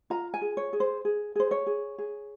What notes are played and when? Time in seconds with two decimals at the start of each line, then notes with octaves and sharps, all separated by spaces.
0.10 F4 A#5
0.34 G#5
0.42 G#4
0.57 C#5
0.73 G#4
0.80 C5
1.05 G#4
1.36 G#4 C5
1.51 C#5
1.67 G#4
1.98 G#4